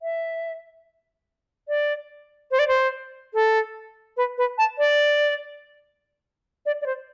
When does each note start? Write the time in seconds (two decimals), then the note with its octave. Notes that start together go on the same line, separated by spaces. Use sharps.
0.02 E5
1.68 D5
2.51 C5
2.59 D5
2.68 C5
3.34 A4
4.17 B4
4.38 B4
4.58 A5
4.78 D5
6.66 D5
6.81 D5
6.86 C5